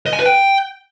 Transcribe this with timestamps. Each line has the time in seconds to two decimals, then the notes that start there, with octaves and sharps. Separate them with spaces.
0.06 D#5
0.13 G#5
0.19 B4
0.26 G5